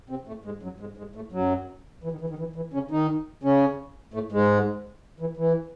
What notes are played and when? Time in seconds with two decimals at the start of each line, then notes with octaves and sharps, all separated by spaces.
0.10 C3 C4
0.27 A2 A3
0.45 G#2 G#3
0.63 F#2 F#3
0.80 G#2 G#3
0.97 G#2 G#3
1.15 A2 A3
1.32 F#2 F#3
2.04 E3
2.12 D#3
2.21 E3
2.30 D#3
2.39 E3
2.56 E3
2.73 C#3 C#4
2.91 D#3 D#4
3.43 C#3 C#4
4.14 A2 A3
4.32 G#2 G#3
5.20 E3
5.37 E3